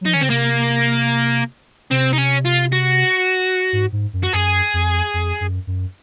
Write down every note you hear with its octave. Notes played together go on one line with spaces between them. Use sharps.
F#3
F3 D#4
D#3 C#4
C#3 C4
C3 A#3
C3 C4
D#4
C#4
F4
F#4
G#2
G#2
F#2
F#4
F#2 G#4
F2
F2
F#2
F#2